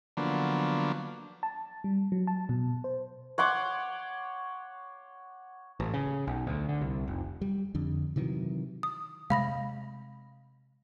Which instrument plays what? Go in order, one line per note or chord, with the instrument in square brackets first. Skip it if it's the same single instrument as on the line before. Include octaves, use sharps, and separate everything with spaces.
[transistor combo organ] D3 F3 F#3 A#3 B3 D4
[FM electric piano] A5
G3
F#3
A5
B2
C5
[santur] C#5 F#5 C6 D6
[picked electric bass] A1
C#3
B1
D2
D3
C2
F1
[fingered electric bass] G3
F2 D3
C3 D#3 E3 F#3
[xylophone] D#6
[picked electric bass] C3 G#3 [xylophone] F5 B5 A#6